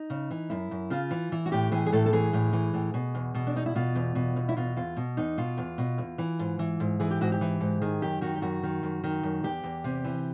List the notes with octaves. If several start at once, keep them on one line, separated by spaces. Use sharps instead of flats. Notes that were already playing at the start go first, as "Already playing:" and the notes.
Already playing: D#4
C#3
E3
F#2 E4
F#2
C#3 F4
E3
E3
F#4
A2 G4
E3 G#4
G#4
A2 A4
A4
E3 G#4
A2
E3
A2
B2
E2
B2
D4
E2 D#4
E4
B2 F4
E2
B2
E2
E4
B2 F4
E2 F4
B2
E2 D#4
B2 F4
E2
B2
E2
E3
G#2
E3
G#2
E3 G#4
G4
G#2 F#4
G4
E3
G#2
D#3 G#4
F#2 G4
D#3 F#4
G4
F#2 F#4
D#3
F#2
D#3
F#2
E2 G4
E2
C3
E3